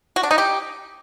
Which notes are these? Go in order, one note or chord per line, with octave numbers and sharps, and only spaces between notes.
F#4
D4
D#4
G4